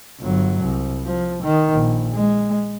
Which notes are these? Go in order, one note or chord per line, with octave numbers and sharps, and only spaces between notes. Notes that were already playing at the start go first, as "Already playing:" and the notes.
G1 F#3
C2
F3
D#3
A#1
G#3